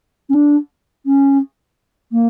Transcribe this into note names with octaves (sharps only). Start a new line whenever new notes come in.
C#4
D4
C#4
A#3